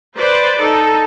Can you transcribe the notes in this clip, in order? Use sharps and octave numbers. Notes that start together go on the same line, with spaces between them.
B4 C5 D5
D#4 A4